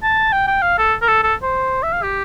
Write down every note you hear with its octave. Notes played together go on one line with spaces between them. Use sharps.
A5
G5
G5
F5
A4
A#4
A4
A4
C5
E5
F5
G4